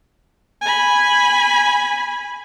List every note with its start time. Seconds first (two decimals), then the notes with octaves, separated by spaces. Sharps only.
0.61 G#5 B5